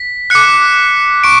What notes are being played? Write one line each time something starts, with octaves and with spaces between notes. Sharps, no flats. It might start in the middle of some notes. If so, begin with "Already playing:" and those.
Already playing: B6
D6 F#6 C#7
C#6 D7